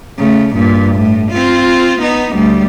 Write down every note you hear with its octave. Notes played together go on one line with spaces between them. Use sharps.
C#3 A3
G2 A#2
A2
C4 F4
B3 D#4
D2 G3